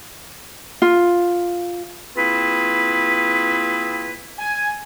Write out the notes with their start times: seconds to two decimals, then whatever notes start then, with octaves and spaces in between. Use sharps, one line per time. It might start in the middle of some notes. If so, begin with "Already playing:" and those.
0.82 F4
2.16 A#3 C4 E4 F4 G#4 B4
4.39 G#5